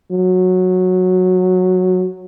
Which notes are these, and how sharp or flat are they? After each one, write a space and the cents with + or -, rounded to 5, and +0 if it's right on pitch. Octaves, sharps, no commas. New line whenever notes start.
F#3 -10